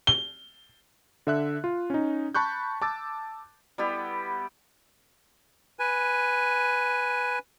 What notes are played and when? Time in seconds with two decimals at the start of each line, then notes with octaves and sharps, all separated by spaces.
0.07 G7
1.27 D3 E5 F#6
1.64 F4
1.90 C#4 D#4
2.35 A5 B5 C#6 F#6 G6
2.82 A5 D6 E6 A6
3.78 G3 B3 E4 G4
5.79 B4 G#5